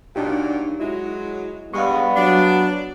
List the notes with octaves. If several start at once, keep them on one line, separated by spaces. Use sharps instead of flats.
A#2 F#3 D4 D#4 G4
F#3 G#3 E4
G2 G3 G#3 B3 F5 C#6
F#3 D4